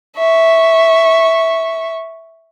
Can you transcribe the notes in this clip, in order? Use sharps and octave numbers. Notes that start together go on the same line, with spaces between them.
E5 C#6